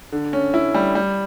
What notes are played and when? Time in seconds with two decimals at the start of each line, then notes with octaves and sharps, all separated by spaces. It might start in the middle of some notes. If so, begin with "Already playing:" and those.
0.12 D3
0.33 C#4
0.54 E4
0.74 G3
0.95 G3